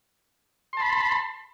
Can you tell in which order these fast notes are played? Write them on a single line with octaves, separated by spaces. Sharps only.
C6 A5 B5